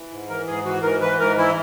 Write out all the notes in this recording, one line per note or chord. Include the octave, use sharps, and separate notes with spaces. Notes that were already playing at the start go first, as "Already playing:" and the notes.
Already playing: E3
G#2
E3 A#4
G#2 G#4
E3 F#4
G#2 A#4
E3 B4
G#2 A#4
E3 E4